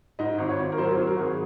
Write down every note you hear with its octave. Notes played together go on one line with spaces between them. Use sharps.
G#2 D#5
G#1
C#5
G#1
A#4
F#3 C5
A#4
C5
F#3
A#4
G#1
G#4